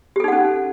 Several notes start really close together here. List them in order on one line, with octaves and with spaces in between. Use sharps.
G4 A4 D#4 F#5 C#4